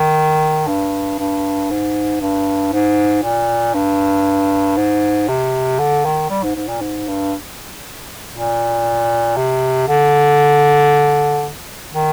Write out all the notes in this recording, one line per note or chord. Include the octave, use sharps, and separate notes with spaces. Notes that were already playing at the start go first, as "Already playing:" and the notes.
Already playing: D#3
G2
G2
G#2
G2
G#2
A#2
G2
G#2
C3
D3
D#3
G3
G#2
G#2
A#2
G#2
G2
A#2
C3
D3
D#3